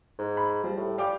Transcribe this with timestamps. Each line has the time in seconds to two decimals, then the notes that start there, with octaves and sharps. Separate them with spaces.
0.19 G#2
0.37 B5
0.64 F3 G3
0.77 A2
0.98 G3 F5 G5 D6